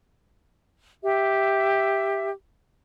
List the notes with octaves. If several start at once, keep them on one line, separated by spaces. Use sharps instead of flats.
G4 E5